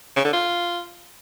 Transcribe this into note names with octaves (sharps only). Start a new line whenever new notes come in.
C#3
D3
F4